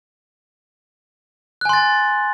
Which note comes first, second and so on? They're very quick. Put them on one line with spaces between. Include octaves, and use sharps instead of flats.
F#6 G#5 C6 A6